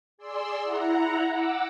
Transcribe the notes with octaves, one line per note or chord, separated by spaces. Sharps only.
G#4 D5 C6 E6
E4 F#5 A#5
F#5 D6 E6